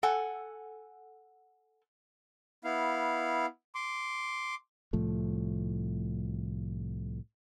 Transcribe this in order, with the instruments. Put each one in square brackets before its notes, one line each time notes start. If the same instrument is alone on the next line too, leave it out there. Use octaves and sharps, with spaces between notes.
[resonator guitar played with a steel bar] A4 F#5 G#5
[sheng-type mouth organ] B3 E4 F5
C6 D6
[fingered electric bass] C2 A2 F3 A3